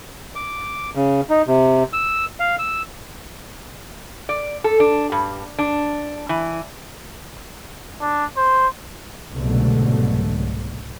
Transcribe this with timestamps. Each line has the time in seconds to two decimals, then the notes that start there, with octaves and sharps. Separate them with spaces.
0.35 D6
0.95 C#3
1.30 D#4
1.47 C3
1.93 E6
2.40 F5
2.59 E6
4.29 D5
4.64 A4
4.80 D4
5.12 G2
5.58 D4
6.29 E3
8.01 D4
8.37 C5
9.33 C2 G#2 B2 D3 F#3 A3